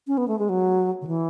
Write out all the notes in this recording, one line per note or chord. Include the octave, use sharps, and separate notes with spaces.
C#4
B3
A3
G#3
F#3
D3
E3